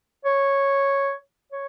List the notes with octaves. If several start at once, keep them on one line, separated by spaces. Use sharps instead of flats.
C#5
C#5